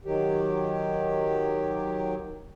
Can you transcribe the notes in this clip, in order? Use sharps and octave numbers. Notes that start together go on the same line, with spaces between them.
D#3 F#3 G4